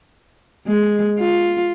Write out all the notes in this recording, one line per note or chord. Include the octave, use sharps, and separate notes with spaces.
G#3
F4